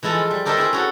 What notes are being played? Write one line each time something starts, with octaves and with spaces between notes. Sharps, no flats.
E3 G#3 E4 F4 A4
F3
G3
G4 A4 A#4 C5 D#5 E5
C4 E4 G#4 C5
C#4 F#4 A4